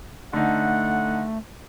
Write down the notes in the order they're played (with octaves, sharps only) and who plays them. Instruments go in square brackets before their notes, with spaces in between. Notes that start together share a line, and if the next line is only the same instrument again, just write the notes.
[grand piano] D3 D#4 [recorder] A3 [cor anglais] F#5